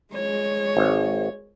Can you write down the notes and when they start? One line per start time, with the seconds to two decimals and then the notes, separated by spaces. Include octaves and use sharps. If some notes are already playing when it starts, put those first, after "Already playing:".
0.14 G#3 C#5
0.77 G#1